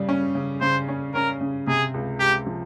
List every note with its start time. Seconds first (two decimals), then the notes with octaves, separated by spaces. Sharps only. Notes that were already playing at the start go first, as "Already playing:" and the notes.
Already playing: C#3 G3
0.09 C#4
0.35 C#3
0.61 C#3 C5
0.88 C#4
1.14 C#4 A#4
1.41 C#3
1.67 C3 G#4
1.94 C#2
2.20 C#2 G4
2.46 F3